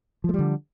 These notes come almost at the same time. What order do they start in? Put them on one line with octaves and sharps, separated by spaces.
F3 A3 G3 D3